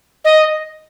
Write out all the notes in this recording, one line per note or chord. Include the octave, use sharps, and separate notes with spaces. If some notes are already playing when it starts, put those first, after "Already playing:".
D#5